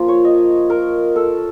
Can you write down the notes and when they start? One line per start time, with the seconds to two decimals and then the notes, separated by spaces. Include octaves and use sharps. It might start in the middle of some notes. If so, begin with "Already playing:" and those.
Already playing: F3 A#3 F4
0.08 C#5
0.24 D#5
0.70 A#4
1.16 A4